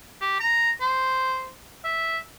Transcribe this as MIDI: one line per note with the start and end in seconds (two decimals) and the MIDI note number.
0.21 0.37 67
0.40 0.71 82
0.81 1.49 72
1.85 2.19 76